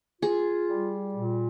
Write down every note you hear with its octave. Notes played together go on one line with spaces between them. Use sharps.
F4 G#4
G3
A#2